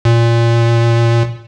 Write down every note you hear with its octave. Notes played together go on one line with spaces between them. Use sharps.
A#2